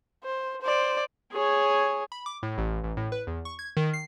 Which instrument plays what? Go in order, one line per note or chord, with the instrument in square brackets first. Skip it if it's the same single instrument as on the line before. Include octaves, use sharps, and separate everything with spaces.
[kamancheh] C5
C5 D5
[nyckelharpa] G#4 C#5
[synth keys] B5
D6
A2
A1
A1
A2
B4
E2
C#6
G#6
D#3
C7